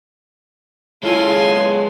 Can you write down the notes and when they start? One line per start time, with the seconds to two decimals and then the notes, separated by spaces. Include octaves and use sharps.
1.03 C#3 G#3 E4 F4 A4 G#5 C6
1.43 B3